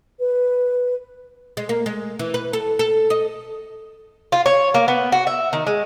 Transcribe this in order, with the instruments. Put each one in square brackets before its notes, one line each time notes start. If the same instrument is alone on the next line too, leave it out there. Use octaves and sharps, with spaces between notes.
[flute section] B4
[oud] G#3
A#3
G#3
E3
B4
A4
A4
D#5
[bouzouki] F4
C#5
A#3
B3
F#4
E5
D#3
G#3